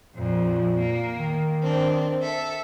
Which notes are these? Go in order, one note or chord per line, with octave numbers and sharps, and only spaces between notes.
F2 A#2
A#3
D#3
C4 D4
A4 E5